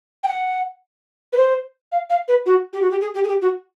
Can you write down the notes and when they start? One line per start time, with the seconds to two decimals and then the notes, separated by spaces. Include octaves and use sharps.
0.23 G5
0.28 F#5
1.33 B4
1.37 C5
1.92 F5
2.10 F5
2.28 B4
2.46 F#4
2.73 G4
2.82 F#4
2.91 G4
3.01 G#4
3.14 G4
3.24 G#4
3.28 G4
3.42 F#4